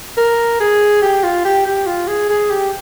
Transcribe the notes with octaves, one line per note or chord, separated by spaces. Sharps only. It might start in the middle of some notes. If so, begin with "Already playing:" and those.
A#4
G#4
G4
F4
G4
G4
F4
G#4
G#4
G4